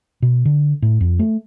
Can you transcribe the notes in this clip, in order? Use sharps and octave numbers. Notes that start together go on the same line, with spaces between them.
B2
D3
A2
F2
A3